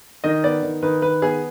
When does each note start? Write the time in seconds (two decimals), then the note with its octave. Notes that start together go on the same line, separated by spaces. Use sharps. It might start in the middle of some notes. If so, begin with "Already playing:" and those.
0.24 D#3 D#5
0.44 B3 D5
0.63 D#3
0.83 D#3 B4
1.02 D#3 B4
1.22 B3 G#4